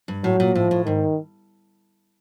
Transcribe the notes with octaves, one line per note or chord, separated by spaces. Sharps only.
G2
A2 F#3
A#2
A2 F3
A2
G#2 D#3